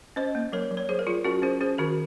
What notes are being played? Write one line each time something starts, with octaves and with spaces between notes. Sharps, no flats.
C#4 C5 D#5
A#3
F#3 A#4 C#5
F#3
C#5
F#3 G#4 C5
A#4
F#3 F4 G#4
C#4 F#4 A#4
C#4 G#4 C5
C#4 G#4 C5
D#3 F#4 A#4